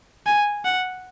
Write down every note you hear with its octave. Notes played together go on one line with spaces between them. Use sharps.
G#5
F#5